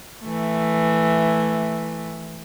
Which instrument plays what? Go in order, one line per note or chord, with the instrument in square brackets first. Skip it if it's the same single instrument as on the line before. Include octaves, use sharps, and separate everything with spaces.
[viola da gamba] E3 A3